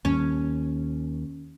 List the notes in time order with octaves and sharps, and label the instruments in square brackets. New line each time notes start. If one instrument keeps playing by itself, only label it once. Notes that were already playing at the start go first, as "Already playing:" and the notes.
[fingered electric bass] D#2 [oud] C#4